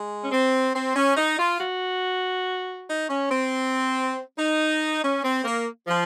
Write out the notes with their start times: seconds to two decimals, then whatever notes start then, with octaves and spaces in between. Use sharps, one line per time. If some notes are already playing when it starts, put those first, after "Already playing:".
Already playing: G#3
0.22 C#4
0.31 C4
0.74 C4
0.95 C#4
1.16 D#4
1.38 F4
1.58 F#4
2.88 D#4
3.08 C#4
3.30 C4
4.37 D#4
5.01 C#4
5.23 C4
5.44 A#3
5.87 F3